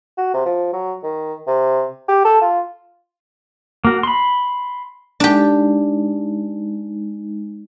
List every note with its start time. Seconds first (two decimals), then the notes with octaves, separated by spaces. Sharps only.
0.18 F#4
0.34 C3
0.46 F3
0.73 F#3
1.03 D#3
1.47 C3
2.08 G4
2.25 A4
2.42 F4
3.85 A#3 F#4
4.03 B5 C6
5.20 G#3 D4 D#4 G4